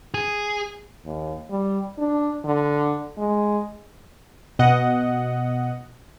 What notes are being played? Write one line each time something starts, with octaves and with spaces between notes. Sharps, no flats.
G#4
D#2
G3
D4
D3
G#3
B2 D#5 F#5